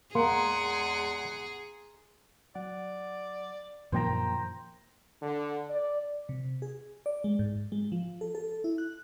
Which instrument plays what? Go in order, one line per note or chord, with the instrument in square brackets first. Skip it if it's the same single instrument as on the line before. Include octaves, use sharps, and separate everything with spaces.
[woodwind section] E2 G#3 F#5 [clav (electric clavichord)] A#3 [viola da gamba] G#4 [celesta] A#5 C6
[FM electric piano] F#3 F#5 [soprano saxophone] D5
[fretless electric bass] F#2 F3 A#3 [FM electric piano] A#2 D#3 [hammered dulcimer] C5 G5 A#5
[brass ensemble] D3
D5
[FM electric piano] C3
G#4
D5
G#3
G#2
G#3
F3
A4
A4
E4
F#6